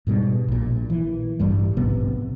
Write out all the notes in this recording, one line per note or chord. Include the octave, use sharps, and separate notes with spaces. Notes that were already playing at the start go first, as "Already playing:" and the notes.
G#2 B2 G3
A#1 A#2
E3
A1 G2 G3
A#1 G#2 C3 B3